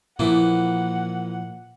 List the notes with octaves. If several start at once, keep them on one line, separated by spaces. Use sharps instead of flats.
A#2 E3 F3 A#3 E4 F#5